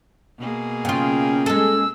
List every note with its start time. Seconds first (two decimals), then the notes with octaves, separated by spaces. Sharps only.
0.39 B2 A#3 G#4
0.85 C#3 C#4 F4 G5
1.46 G#3 A4 E6